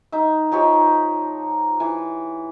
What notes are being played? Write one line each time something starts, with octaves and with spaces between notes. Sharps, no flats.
D#4 E5
F3 D#4 G4 C#5
E3